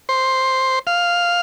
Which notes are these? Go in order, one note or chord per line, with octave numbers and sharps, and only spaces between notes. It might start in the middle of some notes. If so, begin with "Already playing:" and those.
C5
F5